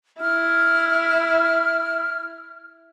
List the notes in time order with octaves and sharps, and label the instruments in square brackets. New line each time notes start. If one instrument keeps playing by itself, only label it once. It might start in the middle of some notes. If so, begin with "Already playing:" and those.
[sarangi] E4 [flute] F6